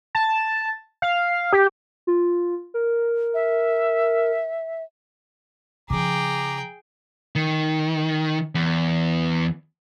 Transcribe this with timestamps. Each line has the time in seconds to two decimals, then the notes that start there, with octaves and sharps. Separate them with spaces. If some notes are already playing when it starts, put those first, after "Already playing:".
0.15 A5
1.02 F5
1.53 G4
2.07 F4
2.74 A#4
3.34 E5
5.90 C#3 F3 G#4 G5 A#5 D6
7.36 D#3
8.55 E2